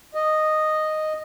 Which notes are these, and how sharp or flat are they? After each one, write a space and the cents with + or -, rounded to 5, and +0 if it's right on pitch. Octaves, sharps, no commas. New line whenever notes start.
D#5 -5